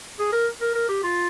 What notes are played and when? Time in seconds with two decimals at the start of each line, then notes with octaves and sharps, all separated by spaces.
0.19 G#4
0.32 A#4
0.61 A#4
0.75 A#4
0.89 G4
1.03 F4